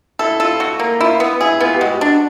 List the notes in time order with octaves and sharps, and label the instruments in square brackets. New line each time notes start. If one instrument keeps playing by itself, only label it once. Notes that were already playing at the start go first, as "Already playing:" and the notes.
[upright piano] E4 [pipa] A4
[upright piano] F4 [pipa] A4
[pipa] F#4
A#3
[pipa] E4 [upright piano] F4
[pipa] B3
[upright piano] E4 [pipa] G#4
[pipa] B3 [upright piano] F4
[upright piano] G4
[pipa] G#3 [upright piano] F#4
[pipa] D4